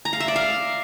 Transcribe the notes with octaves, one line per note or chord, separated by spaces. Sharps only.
A#5
F5
E5
D5
F5